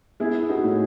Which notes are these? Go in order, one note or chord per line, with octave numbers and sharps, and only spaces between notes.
B3 E4 G#4
D#4 F#4
A2